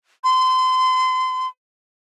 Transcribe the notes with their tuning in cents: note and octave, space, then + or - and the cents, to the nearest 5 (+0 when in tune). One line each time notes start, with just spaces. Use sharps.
C6 -30